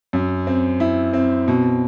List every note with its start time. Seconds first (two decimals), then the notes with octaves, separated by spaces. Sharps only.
0.13 F#2
0.47 C4
0.80 E4
1.13 C4
1.48 B2